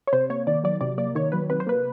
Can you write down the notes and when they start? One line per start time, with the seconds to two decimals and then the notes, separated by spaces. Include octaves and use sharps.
0.07 C#5
0.13 C3 C5
0.30 A#3 C#5
0.47 D#3 D5
0.64 F#3 D5
0.81 C3 D5
0.98 A#3 D5
1.15 D#3 C#5
1.32 F#3 B4
1.50 C3 B4
1.60 C5
1.67 A#3 B4